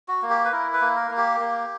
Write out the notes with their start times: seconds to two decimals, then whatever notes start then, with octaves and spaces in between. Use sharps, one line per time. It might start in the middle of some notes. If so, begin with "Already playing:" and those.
0.08 F#4
0.22 A#3
0.30 G4
0.45 B4
0.52 E4 A#4
0.73 B4
0.81 A#3
0.96 A#4
1.11 A#3
1.17 G4
1.40 A#3